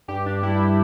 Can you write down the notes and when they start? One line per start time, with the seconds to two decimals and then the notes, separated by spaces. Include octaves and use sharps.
0.08 G2 G4
0.26 D4
0.43 G3 E4